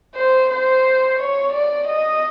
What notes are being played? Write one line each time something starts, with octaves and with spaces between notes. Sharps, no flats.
C5
C5
C#5
D5
D#5